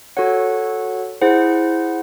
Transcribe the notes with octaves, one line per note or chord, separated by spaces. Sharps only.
F#4 A4 C#5 F#5
E4 G#4 C5 F#5